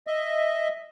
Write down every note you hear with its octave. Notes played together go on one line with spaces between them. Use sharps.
D#5 E5